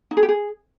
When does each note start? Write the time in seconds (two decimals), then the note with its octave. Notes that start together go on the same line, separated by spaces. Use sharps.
0.11 D#4
0.17 G#4
0.23 G4
0.29 G#4